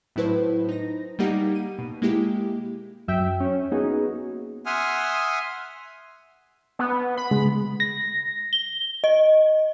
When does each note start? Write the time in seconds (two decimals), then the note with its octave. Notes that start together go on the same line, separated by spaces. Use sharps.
0.16 A2 F#3 E4 B4 C5
0.69 D#4 A#6
1.19 G3 A#3 D#4 G4 F#5
1.55 D#7
1.79 B2
2.02 G#3 A#3 E4 G4
3.08 F#2 E5 G5
3.40 C#4
3.72 A#3 B3 C#4 D#4 F#4 G#4
4.66 E5 F#5 G#5 C6 D#6 F6
6.79 B3
7.17 B5
7.31 C#3 G#3
7.80 A#6
8.53 G7
9.04 D#5